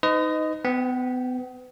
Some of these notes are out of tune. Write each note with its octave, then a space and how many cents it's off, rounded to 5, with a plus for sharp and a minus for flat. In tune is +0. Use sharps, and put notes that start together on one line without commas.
D#4 +10 B4 +45 D#5 +0
B3 +35 G5 +0